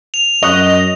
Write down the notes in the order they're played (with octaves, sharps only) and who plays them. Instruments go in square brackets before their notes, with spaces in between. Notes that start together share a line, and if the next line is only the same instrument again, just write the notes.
[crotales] F7
[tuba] F#2 [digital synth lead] D#5 [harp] C#6 D#6 F#6